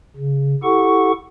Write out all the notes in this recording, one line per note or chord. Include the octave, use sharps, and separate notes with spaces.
C#3
E4 G4 A4 F#5 C#6